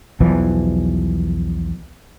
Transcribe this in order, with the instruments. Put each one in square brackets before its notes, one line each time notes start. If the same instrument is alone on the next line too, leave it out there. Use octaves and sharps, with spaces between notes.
[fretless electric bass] B1 E2 E3 F3